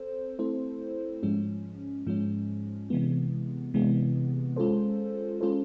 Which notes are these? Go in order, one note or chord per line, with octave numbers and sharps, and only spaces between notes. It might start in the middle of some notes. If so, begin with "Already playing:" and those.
Already playing: C4 A4 C5
A3 C4 E4 A4 C5
G#2 F3 G#3 C#4
G#2 F3 G#3 C#4
C3 E3 G#3 B3
C3 E3 G#3 B3
G#3 C#4 F4 A4 C5
G#3 C#4 F4 A4 C5